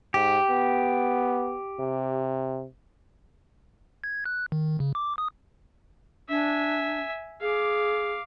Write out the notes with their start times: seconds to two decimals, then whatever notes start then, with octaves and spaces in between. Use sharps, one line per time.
0.14 G#2 G4
0.50 B3
1.79 C3
4.04 G#6
4.26 F#6
4.52 D#3
4.80 C#3
4.95 D6
5.18 D#6
6.29 D4 E5 G#5
7.41 G#4 F5 D6